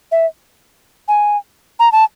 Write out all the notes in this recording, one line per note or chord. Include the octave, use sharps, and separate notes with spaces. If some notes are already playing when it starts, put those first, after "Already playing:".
E5
G#5
A#5
A5